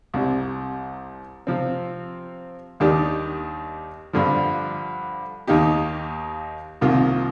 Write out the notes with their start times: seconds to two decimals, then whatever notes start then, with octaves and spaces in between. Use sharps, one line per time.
0.14 C2 C3 G3
1.47 C3 F3 C4
2.80 D#2 D#3 G3 D4 G4
4.13 G2 D3 F3
5.47 D#2 D#3 A#3 D#4 G4
6.81 C2 C3 D#3 A#3 F4